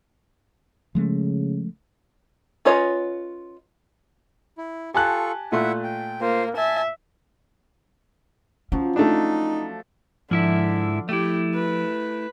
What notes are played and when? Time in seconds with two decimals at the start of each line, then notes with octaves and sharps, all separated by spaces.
0.95 C#3 F3 G#3 A3
2.65 C#4 F4 B4 C#5 D#5
4.58 E4
4.95 F4 G4 A4 G#5 A5 C#6 F#6
5.52 A#2 A3 E4 E5 F#5 C6
5.83 G5
6.21 A#3 F4 C5
6.57 E5 G#5 A5
8.72 F3 F#3 C#4
8.96 A3 D4 D#4
10.31 G#2 D3 F3 E4 E5
11.09 A3 E4 G4
11.54 B4